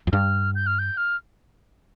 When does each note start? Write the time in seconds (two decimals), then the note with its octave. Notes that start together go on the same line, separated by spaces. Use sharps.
0.07 F2
0.12 G2 F6
0.55 G6
0.67 F6
0.79 G6
0.97 F6